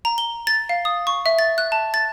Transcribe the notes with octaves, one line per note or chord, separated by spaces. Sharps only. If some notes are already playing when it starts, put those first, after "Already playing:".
A#5
G7
A6
F5
D#6
C#6
E5
A6
F#6
A5
A6